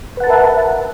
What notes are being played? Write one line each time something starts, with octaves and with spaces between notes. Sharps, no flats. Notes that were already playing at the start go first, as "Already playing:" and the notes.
A#4 B4 E5 F#5 A5